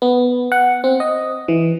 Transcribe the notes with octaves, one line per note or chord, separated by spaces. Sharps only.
B3
F#5
C4
D#5
E3